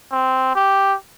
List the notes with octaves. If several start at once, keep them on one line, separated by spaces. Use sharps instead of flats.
C4
G4